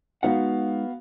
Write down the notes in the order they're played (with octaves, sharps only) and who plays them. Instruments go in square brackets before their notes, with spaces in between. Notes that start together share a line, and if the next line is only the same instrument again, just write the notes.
[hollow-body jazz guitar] G#3 D#4 F#5 [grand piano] B3 F#4 F5